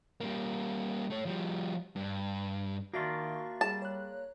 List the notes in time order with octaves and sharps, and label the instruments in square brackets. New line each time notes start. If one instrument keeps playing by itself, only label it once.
[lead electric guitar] G3 A#3
A3 C#5
F3 G3
G2
[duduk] D#3 [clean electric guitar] A#3 D4 F4 [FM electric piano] F#4 E5 C#6
[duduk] G3 [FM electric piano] G#4 [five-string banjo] A5
[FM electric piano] C#5 F#6